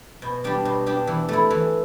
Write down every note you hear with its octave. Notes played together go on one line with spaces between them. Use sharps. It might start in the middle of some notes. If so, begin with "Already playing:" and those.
B2
G3 D4 G4
B2
G3 D4 G4
E3
A3 E4
E3